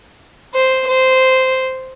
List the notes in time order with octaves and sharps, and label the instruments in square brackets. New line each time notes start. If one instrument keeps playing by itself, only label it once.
[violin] C5
C5